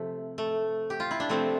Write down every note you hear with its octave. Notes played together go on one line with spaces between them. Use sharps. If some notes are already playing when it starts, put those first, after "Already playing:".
Already playing: C3 F3 A3
A3
G4
F4
E4
D4
C3 F3 A3 C4